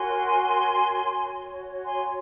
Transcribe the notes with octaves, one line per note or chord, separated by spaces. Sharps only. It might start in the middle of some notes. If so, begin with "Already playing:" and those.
Already playing: F#4 A#4 C#5 G#5 C6
F#4 C#5
G#5 C6